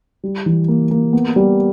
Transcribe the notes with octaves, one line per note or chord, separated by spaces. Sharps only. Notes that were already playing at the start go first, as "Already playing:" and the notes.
G3
E3
A#3
A#3
B3
G3